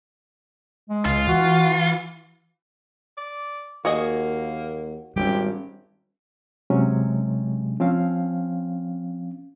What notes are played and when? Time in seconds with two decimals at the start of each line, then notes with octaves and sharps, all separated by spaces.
0.90 G#3
1.06 C#2 F4
1.28 E3 F#4
3.17 D5
3.85 D#2 A#3 F#4 G#4 D#5
5.16 G#1 G3 C#4 G4
6.70 C3 F#3 G#3 C#4
7.80 F3 C4 C#4 F5